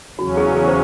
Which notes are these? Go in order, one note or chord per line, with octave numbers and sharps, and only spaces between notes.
E2 C#3 F#3 C#4 F#4
G#4
G#4
C5